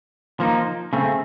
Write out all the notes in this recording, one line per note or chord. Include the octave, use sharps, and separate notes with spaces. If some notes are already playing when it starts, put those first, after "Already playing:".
F3 A#3 D#4
C#3 A3 C4